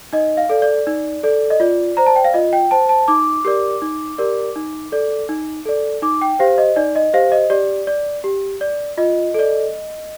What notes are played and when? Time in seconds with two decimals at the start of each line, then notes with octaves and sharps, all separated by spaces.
0.13 D#4 D#5
0.37 F5
0.49 A4 D5
0.62 D5
0.87 D#4
1.23 A4 D5
1.50 D#5
1.60 F4 D5
1.97 C5 A#5
2.06 A5
2.16 G5
2.25 F5
2.34 F4 D#5
2.53 G5
2.71 C5 A5
2.89 A5
3.08 D#4 D6
3.45 G4 A#4 D5
3.82 D#4
4.18 G4 A#4 D5
4.56 D#4
4.92 A4 D5
5.29 D#4
5.66 A4 D5
6.02 D#4 D6
6.21 G5
6.39 G4 C5 F5
6.58 D#5
6.76 D#4 D5
6.96 D#5
7.13 G4 C5 F5
7.32 D#5
7.50 G4 D5
7.87 D5
8.24 G4
8.61 D5
8.97 F4 D#5
9.34 A4 D5